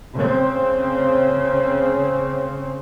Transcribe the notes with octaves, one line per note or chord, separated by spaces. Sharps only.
C#3 C4